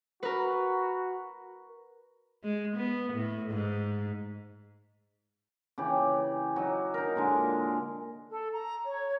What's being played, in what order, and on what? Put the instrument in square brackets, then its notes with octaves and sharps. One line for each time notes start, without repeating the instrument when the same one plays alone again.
[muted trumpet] F#4 [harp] A#4 B4
[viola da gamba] G#3
B3
A2
G#2
[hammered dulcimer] C#3 E3 G4
F#3 D#4
D#4 A#4
A#2 D3 G#3
[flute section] A4
A#5
C#5